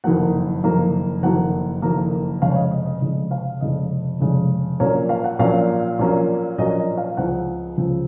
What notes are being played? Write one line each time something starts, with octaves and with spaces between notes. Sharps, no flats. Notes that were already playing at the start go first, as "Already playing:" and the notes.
F#1 F2 D#3 F#3 A#3 F#5
F#1 F2 D#3 F#3 A#3
F#1 F2 D#3 F#3 A#3 F#5
F#1 F2 D#3 F#3 A#3
F1 F2 C#3 G#3 F5
C#5
D#5
D#5
D#5
F1 F2 C#3 G#3
F5
F1 F2 C#3 G#3 D#5
F1 F2 C#3 G#3
A#1 A#2 F#3 A#3 C#4 C#5
F5
F#5
A#1 A#2 F#3 A#3 C#4 F5
A#1 A#2 F#3 A#3 C#4
A#1 A#2 F#3 A#3 C#4 D#5
D#5
F5
C#2 C#3 F3 C4 F#5
C#2 C#3 F3 C4